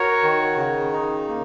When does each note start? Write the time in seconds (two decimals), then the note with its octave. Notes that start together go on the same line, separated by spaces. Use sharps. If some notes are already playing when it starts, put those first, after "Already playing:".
Already playing: F#4 A#4 C#5
0.23 D#3
0.57 C#3
0.92 D#4
1.28 A#3